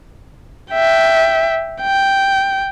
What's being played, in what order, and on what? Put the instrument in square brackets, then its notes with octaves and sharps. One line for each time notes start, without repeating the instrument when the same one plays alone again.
[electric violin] E5 G5
G5